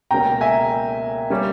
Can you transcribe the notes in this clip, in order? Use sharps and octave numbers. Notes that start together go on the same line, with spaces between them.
C#2 B2 A#3 C#4 G5 A#5
E5 G#5
G3 A#3 C#4